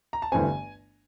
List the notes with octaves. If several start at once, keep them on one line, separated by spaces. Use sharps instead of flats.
A#5
A5
G1 G2 E3 A3 C4 G#5